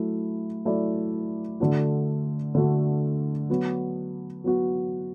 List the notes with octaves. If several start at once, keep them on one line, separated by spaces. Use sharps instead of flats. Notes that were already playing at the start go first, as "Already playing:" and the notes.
Already playing: F#3 A3 E4
F#3 A3 E4 D5
D3 A3 D4 F#4
D3 A3 D4 F#4
F#3 B3 F#4
F#3 B3 F#4